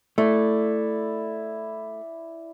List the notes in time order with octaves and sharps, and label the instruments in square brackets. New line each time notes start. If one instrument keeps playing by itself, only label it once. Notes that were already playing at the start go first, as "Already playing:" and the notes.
[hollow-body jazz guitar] A3 [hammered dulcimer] E4 D5